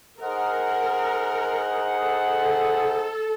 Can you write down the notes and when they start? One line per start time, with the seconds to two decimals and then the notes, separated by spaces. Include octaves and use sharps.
0.20 D#4 G#4 A#4 C5 D#5 F#5
2.02 A4